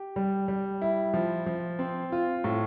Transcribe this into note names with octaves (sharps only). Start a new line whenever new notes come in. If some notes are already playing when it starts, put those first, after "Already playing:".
Already playing: G4
G3
G3
E4
F3
F3
C4
F4
A2